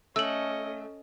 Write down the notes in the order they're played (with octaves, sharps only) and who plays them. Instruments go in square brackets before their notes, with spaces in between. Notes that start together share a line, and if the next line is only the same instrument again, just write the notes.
[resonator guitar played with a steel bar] A3 [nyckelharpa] C#4 D#5 [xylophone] E6 F#7